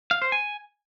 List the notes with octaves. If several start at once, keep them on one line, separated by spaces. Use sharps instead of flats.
F5
C5
G#5